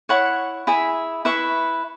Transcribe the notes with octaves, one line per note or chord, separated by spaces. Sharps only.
E4 C#5 F#5 C#6
E4 G#4 E5
E4 B4 E5 C#6